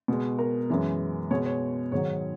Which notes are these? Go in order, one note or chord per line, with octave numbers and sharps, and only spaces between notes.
B2 G#3
A#4
F#2 E3 G#3
B2 G#3 C#5
C#5
G#2 D#3 F#3 C#5